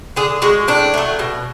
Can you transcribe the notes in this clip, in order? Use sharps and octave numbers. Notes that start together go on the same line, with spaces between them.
D3 G#4
G#3 F#4
A2 D4
F#3 A3
B2